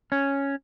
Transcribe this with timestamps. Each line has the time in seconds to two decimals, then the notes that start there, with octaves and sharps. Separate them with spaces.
0.12 C#4